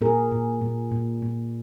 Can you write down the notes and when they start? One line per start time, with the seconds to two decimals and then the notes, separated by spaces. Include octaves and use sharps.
0.01 A#2 G#4 A#4
0.32 A#2
0.61 A#2
0.92 A#2
1.22 A#2